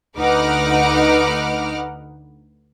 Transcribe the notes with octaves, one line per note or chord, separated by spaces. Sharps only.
D2 D#4 B4 F#5 D6 F6